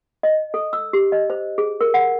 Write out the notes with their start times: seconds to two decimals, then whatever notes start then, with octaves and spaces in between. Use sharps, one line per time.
0.23 D#5
0.54 A4
0.73 E6
0.93 G4
1.12 D#5
1.30 C5
1.58 G#4
1.81 A#4
1.94 F#5